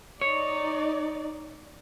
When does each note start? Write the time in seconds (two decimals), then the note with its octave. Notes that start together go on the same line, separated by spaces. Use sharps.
0.21 D#4 C#5 D5